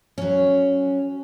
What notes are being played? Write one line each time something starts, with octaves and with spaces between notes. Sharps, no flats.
F#3 C#4